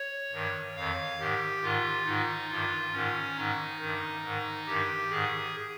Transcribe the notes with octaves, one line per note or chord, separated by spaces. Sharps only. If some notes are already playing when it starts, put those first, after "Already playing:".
Already playing: C#5
G2 D#3
F2 D#3 F5
G#2 D#3 G4
G#2 D#3 F4
G#2 D#3 D#4
G2 D#3 F4
G#2 D#3 C#4
G#2 D#3 D#4
G2 D#3
G#2 D#3
G2 D#3 G4
G#2 D#3 G#4